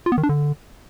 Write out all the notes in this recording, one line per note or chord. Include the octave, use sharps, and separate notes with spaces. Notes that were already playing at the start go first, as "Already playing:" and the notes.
F4
B3
D#3
D4
D3